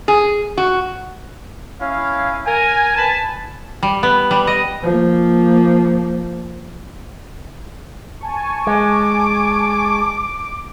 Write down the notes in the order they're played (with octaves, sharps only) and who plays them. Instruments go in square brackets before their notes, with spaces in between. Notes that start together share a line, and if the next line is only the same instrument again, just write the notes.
[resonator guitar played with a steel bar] G#4
F#4
[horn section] C#4 E4 F5
A#4 G#5
B4 G#5 A5
[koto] G3
B3
G3
D#5
[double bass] F3 A#3
[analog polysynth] G#5 A5 C#6
[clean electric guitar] G#3 [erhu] D6